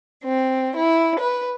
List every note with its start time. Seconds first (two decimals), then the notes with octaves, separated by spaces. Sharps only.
0.23 C4
0.75 E4
1.19 B4